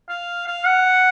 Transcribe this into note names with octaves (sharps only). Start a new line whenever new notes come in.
F5
F5
F#5